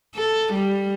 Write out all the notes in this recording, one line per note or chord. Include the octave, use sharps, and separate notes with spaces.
A4
G3